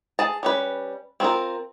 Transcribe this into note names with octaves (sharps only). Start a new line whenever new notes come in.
G#4 A5
G3 C#4 B4
C4 C#4 E4 F4 A#4